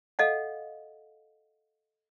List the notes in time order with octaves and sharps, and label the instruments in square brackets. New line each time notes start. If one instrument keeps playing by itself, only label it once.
[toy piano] A4 D#5 F5 F#5